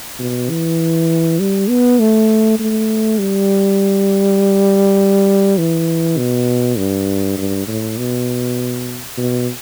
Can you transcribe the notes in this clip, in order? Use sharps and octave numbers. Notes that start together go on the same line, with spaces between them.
B2
E3
G3
B3
A3
A3
G3
E3
B2
G2
G2
A2
B2
B2